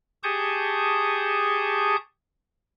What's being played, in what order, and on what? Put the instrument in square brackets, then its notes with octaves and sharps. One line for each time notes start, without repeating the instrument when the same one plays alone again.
[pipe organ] G4 G#4 A5 C#6 D#6 G6